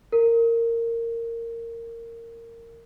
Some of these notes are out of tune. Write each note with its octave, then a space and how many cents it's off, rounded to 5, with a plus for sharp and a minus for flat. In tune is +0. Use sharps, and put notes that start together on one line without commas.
A#4 -15